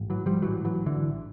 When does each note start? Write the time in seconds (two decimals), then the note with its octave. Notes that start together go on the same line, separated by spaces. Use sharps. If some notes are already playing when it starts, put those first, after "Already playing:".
Already playing: A1 G#2
0.10 E3 F#3
0.26 F3 G3
0.42 A1 G#2 E3 F#3
0.65 E3 F#3
0.86 D3 E3